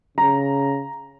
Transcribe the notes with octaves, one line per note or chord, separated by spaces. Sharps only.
C#3 A#5